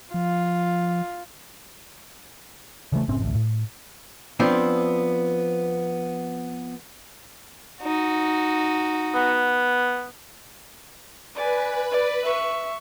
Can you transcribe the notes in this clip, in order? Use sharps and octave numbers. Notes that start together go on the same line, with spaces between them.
F3 F4
C#3 E3 G#3 A3
F#1 A2 C4 C#4
A1 D2
A2
F3 B3 C4 D4
D#4 F#4
B3
B4 D5 G#5
D5
E5 C#6